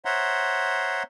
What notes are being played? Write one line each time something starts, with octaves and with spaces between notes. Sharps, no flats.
C5 C#5 E5 F#5 A#5 C6